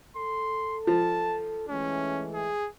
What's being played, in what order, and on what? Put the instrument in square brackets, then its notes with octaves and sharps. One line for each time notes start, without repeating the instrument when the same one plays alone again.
[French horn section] A4 [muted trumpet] C6
[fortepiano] F3 [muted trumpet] A5
[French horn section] E3 G#3 A3 [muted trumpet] C#4
[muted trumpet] G#4